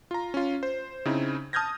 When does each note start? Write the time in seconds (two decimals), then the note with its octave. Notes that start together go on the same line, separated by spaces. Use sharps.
0.11 F4 A#5
0.34 C#4 F4
0.63 C5
1.05 C#3 C4 D#4 E4
1.53 A5 D#6 F6 G6 G#6 A#6